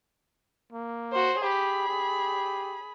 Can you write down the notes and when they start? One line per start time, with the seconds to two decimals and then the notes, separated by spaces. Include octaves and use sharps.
0.73 A#3
1.13 F#4 C5
1.42 G4 G#4 B5
1.88 G4